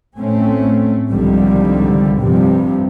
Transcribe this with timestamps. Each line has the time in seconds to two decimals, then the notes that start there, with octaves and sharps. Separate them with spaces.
0.18 A2 A3 C4 C#4
1.11 C2 G#2 D3 D#3 F3 G3
2.20 G2 C3 F3 G3